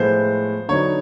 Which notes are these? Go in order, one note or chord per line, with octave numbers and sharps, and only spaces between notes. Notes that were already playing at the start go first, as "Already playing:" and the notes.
Already playing: A2 F3 G#3 B3 C5
D3 F#3 B3 D#4 C#5